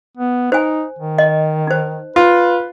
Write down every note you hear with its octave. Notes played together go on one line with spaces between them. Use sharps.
B3
D#4 C5 G#5
D#3
D#5
D#4 C5
F4 B4